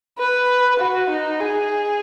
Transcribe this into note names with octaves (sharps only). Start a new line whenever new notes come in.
B4
F#4
D#4
G#4